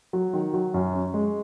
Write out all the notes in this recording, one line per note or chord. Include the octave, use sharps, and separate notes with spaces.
F#3
D#3
F#3
F#2
C#4
G#3